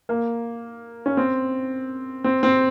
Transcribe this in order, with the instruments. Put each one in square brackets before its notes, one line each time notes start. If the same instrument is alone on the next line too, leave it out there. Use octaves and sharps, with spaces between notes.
[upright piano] A#3
C#4
C4
C4
C4